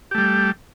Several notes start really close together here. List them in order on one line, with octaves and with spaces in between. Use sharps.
G4 A3 G3